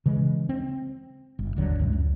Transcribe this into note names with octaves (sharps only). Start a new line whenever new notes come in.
C#3 E3 G#3
C4
G1
D#1 G#1 D3 F#3
C#2 F#2 A2
C#2